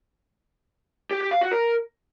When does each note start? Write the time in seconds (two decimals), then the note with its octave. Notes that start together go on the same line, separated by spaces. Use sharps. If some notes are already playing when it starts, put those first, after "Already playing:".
1.11 G4
1.21 G4
1.31 F5
1.41 F#4
1.52 A#4